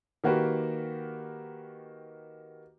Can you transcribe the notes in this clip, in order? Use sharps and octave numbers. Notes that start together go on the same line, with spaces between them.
D#3 A#3 F#4 G4 B4